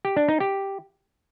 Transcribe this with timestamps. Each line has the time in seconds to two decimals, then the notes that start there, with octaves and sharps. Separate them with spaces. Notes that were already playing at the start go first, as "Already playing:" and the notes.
0.05 G4
0.17 D4
0.28 D#4
0.40 G4